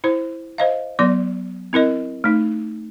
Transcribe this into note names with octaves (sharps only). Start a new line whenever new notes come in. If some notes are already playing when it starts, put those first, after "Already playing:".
E4 C5
C5 D#5 F5
F#3 B3 D5 C6
C4 E4 A#4 D#5
A3 D#4